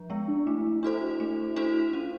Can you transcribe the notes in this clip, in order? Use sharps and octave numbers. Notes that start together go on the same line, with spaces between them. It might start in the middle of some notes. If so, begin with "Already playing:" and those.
Already playing: F3
G#3 B3
D4
A3 E4
D4 E4 F#4 A4 C5
A3
D4 F#4 A4 C5
C#4 F4